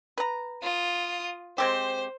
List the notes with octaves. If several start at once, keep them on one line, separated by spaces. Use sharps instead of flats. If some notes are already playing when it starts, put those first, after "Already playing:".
B4 A#5
F4 D#6
G#3 C4 G4 C5